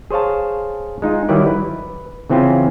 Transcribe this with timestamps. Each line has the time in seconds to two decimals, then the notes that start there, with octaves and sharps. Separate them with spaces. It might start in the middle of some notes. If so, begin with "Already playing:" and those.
0.11 G#4 C5 C#5 F5 A5
1.02 G#3 D#4 F4
1.29 D#3 F#3 G3 E4 B4 D5
1.46 B4
2.30 C#3 E3 C4 C#4 F4